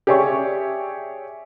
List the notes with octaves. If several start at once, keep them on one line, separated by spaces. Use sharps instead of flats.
G4 G#4 C#5 D5 E5 C#6